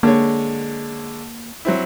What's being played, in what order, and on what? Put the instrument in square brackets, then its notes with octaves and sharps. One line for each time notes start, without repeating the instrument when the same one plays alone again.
[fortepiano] D3 G#3 C#5 [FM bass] A#3
[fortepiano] F#3 C4 E4